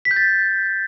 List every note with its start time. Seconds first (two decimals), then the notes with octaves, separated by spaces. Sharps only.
0.05 B6
0.11 G6
0.16 A6